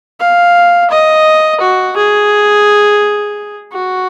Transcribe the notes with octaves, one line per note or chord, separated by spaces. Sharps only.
F5
D#5
F#4
G#4
F#4